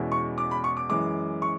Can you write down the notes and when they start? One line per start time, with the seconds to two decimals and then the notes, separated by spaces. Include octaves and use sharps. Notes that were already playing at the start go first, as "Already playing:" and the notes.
Already playing: E2 B2 G#3 C#4 E4
0.12 C#6
0.38 D6
0.51 B5
0.64 C#6
0.77 D6
0.89 F#2 E3 G#3 D6
1.42 C#6